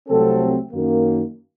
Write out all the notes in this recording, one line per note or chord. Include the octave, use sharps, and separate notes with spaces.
C2 C3 F#3 A3 C4 A4
F#2 D#3 A#3